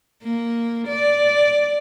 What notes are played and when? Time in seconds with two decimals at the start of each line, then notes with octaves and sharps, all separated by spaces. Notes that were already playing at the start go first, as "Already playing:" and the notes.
0.23 A#3
0.88 D5